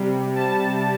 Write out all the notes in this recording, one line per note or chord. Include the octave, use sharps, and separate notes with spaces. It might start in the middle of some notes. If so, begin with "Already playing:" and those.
Already playing: C3 G3
A5